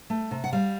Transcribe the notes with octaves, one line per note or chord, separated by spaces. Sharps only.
A3
C3
F#5
G3 F5